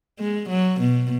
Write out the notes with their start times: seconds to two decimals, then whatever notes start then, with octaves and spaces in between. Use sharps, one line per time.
0.20 G#3
0.49 F#3
0.81 B2